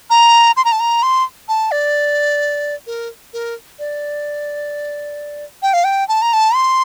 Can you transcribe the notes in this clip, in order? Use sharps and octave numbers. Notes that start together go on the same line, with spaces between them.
A#5
C6
A#5
A5
A#5
C6
A5
D5
A#4
A#4
D5
G5
F5
G5
A5
A#5
A5
C6